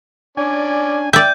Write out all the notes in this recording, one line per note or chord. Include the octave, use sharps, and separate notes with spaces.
C#4 D4 D5 G#5
D5 E5 G5 G6